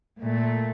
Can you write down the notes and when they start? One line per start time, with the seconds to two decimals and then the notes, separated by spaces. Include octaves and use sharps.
0.20 A#2 A3